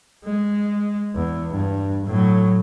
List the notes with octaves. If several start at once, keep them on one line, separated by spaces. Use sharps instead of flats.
G#3
E2
G2
A2 F#3